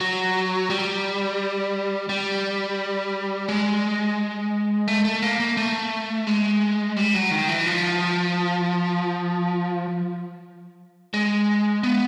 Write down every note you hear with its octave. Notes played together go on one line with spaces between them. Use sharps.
F#3
G3
G3
G#3
A3
A3
A#3
A#3
A3
G#3
G3
F#3
D#3
E3
F3
G#3
B3